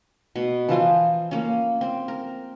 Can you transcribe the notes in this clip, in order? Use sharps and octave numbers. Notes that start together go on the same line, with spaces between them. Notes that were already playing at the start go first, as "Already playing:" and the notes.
B2
E3 F3 F4 C5
A#3 C#4
C4
A#4